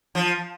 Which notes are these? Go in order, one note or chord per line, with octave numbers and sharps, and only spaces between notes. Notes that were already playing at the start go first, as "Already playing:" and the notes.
F3